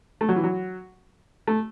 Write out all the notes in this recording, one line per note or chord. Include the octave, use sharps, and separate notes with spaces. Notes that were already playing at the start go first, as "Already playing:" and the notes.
A3
F#3
E3
F#3
A3